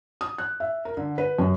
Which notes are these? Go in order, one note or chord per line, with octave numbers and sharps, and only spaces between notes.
D#6
F#6
E5
A#4
D3
B4
F#2